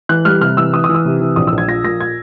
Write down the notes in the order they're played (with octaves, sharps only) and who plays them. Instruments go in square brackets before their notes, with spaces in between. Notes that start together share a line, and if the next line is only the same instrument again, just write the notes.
[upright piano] E3 F#6
G3 F6
C3 F6
E3 E6
E3 D#6
D#6
E3
E6
C3
E3
A#1 D#6
E6
A#1
G#6
F3 A#6
A#2 A#6
G#6